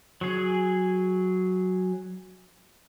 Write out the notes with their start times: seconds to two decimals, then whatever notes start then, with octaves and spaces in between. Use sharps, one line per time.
0.21 F#3 G#4